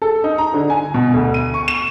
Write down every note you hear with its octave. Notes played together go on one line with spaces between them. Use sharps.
A4
D#4
A#5
D3
G#5
B2
D2
D#7
C#6
E7